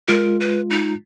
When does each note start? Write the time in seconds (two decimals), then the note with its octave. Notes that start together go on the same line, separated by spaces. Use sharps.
0.08 G#3 F4 A#4
0.40 B4
0.70 D#4